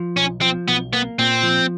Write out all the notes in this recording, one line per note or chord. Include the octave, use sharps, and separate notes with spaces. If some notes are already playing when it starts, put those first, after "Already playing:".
Already playing: F3
B1 C#4
F3 C4
B1 B3
A#3 B3
A#2 C4
F3